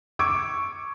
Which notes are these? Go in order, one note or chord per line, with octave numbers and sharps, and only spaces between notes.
C#6 D6 E6 G#6 D7